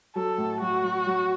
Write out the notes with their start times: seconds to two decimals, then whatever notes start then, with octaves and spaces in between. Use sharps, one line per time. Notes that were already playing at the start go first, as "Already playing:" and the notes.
0.16 F#3 A4
0.38 A2
0.61 F#3 F#4
0.83 F#3
1.07 F#3